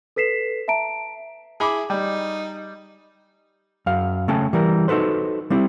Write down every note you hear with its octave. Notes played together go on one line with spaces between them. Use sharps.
A4 B4 B6 C7 E7
E5 A5 A#5 D7
E4 G#4 B5 D6
G3 D#4
F#2 F5
C#3 A3 C#4 G5 A5
E3 G3 A#4
D#4 F#4 A4 B4 C5
G3 C4 E4